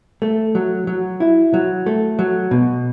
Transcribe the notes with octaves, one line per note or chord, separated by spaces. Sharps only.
A3
F#3
F#3
E4
F#3
A3
F#3
B2